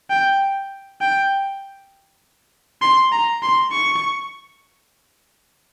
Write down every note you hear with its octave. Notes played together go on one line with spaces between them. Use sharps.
G5
G5
C6
A#5
C6
C#6